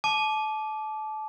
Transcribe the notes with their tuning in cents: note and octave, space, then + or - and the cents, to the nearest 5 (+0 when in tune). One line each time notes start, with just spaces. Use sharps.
A5 -30 D6 +0